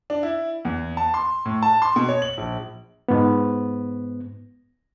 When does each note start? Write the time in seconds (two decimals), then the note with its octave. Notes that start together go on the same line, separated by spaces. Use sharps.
0.10 D4
0.23 E4
0.65 E2
0.97 A5
1.14 C6
1.45 A2
1.63 A5
1.82 C6
1.96 B2
2.09 C#5
2.22 F#7
2.37 A#1
3.08 G#2 B3